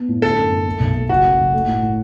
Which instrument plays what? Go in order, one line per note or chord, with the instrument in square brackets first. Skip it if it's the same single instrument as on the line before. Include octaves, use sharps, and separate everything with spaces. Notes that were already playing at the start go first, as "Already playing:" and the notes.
Already playing: [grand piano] B3
A2
[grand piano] D3 [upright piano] A4
[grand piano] F#2
F#2
A3
B1
A3
[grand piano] F#1 [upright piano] F#4
[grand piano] F#2
F#1
A3
A2
A2